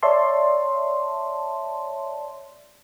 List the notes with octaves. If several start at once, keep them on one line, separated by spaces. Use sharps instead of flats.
C#5 D5 E5 A5 C6